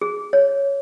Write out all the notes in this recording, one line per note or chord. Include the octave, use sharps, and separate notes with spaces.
G#4
C#5